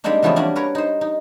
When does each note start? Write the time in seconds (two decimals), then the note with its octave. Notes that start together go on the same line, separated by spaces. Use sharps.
0.04 G3 G#3 A#3 C4 D4 D#4
0.22 C#3 E3 F3 A3 B3 C4
0.36 G3 A#3 C#4 D4 F#4
0.56 A#4 B4 C#5 A#5
0.75 D#4 C5
1.01 D#4